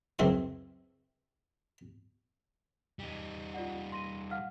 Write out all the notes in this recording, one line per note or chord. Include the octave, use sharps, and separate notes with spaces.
C#2 F#2 C4 E4 B4
G3 D#4
F4 D5 F#5
C6 A#6 D#7
F5 F#5 F6